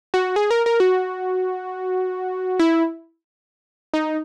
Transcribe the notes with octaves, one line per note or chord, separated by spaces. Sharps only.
F#4
G#4
A#4
A#4
F#4
E4
D#4